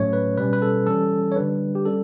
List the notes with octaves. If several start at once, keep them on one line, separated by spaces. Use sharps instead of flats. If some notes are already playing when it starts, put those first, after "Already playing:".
Already playing: A2 F#3 A3 C#4 C#5
B4
B2 G3 C#4 B4
B4
A4
E3 G3 C#4 A4
C#5
D3 G3 D4 B4
G4
G3 C#4 A4